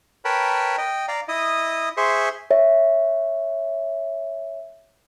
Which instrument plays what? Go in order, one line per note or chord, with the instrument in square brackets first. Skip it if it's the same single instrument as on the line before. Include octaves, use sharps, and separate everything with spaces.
[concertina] A#4 B4 C#5 G5 A5 B5
D#5 G5
D5 F5 A#5
E4 D#5 D#6
G#4 C5 E5 C6 C#6
[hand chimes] C#5 E5